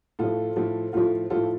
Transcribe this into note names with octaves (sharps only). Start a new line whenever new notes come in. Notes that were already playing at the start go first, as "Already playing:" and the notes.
A2 F3 F4 A4
A2 F3 F4 A4
A2 F3 F4 A4
A2 F3 F4 A4